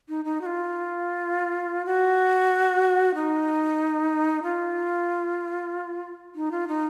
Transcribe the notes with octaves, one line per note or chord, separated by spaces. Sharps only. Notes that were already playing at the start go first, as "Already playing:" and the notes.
D#4
D#4
F#4
F4
F#4
D#4
F4
D#4
F4
D#4